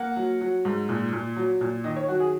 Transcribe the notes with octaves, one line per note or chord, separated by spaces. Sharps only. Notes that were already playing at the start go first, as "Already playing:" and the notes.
Already playing: A#3 F#5
F#3
F#3
G#2
A#2
A#2
F#3
A#2
D#3 D#5
C#5
F#3 F#4
G#4